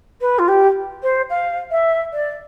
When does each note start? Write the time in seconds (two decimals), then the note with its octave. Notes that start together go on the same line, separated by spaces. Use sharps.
0.21 B4
0.38 F4
0.48 G4
1.02 C5
1.29 F5
1.71 E5
2.13 D5